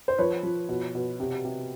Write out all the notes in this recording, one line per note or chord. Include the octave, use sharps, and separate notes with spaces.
C5
F3 B4 C#5
F3
B2
B2
C3
C3